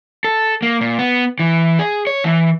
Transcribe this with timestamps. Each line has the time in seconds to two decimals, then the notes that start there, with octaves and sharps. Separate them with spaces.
0.24 A4
0.62 A#3
0.81 A#2
0.99 B3
1.39 E3
1.79 G#4
2.07 C#5
2.24 E3